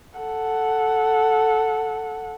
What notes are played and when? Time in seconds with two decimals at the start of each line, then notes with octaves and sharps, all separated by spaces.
0.19 A4 F#5